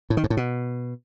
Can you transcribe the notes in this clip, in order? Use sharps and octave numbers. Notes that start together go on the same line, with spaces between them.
A2
D#3
G#2
A2
B2